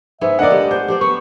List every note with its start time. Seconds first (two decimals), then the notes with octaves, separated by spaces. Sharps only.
0.21 G#2 B3 G#4 E5
0.39 D3 A#3 D5 D#5 F#5
0.50 G#3 A3 B3 G4
0.71 C5 G6
0.88 D4 G4 C5 D5
1.01 B3 C#6